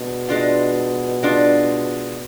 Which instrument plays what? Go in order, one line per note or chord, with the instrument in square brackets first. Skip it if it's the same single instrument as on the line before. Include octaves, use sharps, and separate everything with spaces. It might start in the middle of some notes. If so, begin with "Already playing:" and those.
Already playing: [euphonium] B2 [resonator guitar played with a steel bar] G#3 D4
[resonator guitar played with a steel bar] G#3 D4 F4
G#3 D4 F4